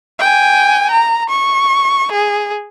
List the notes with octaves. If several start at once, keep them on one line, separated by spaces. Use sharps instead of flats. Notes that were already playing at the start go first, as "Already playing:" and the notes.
G5 G#5
A#5
C#6
G#4